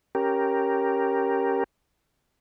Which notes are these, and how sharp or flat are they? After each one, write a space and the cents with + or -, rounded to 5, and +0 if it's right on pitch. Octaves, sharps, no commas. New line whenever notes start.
C#4 -5 G4 +0 A#4 +0